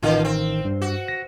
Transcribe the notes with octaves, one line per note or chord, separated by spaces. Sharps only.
A1 A#2 D#3 F4
C4
G2
F#4
A#6